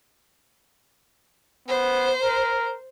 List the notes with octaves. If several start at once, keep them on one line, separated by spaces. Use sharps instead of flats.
B3 C5
A#4